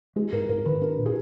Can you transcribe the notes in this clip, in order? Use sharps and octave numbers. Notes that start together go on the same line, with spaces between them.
G#3 G#4
G#2 A#4
G#2 A#4
D#3 B4
D4 A#4
A#2
G#4